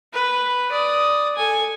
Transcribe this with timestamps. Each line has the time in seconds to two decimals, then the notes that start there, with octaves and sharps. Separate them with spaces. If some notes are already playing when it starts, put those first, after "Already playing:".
0.14 B4
0.72 D5 D#6
1.36 A4 G#5